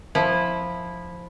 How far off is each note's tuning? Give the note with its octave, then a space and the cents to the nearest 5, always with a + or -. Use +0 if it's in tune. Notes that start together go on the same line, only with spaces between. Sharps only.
F3 +5 E4 -5